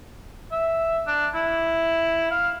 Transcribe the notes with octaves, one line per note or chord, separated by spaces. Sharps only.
E5
D4
E4
F5